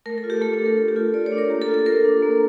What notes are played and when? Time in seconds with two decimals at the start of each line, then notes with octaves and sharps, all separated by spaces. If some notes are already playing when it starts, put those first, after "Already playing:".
0.06 A3 A#4
0.18 A4
0.24 F4
0.30 G4
0.42 A3 A4
0.54 A4
0.60 D4
0.66 A#4
0.78 A3 A4
0.88 G4
0.96 F4 A4
1.14 A3 D5
1.26 C#5
1.32 D4
1.38 A#4
1.50 A#3 G4
1.62 A4
1.68 F4
1.74 A4
1.86 A#3 A#4
2.04 D4
2.22 A#3